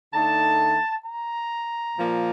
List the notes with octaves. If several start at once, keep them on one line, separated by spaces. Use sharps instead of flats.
D3 A3 D#4 A5
A#5
A#2 F3 A#3